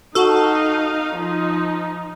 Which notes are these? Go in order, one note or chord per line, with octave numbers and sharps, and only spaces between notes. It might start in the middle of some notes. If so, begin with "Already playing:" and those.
D#4 F#4 A4 F5
F3 D#4